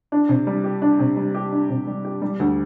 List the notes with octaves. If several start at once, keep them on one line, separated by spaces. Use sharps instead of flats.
D4
C3
G3
G4
D4
C3
G3
G4
D4
C3
G3
G4
G3
D2